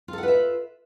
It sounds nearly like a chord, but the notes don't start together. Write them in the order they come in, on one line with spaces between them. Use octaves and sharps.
F4 A4 F#5 B4 E5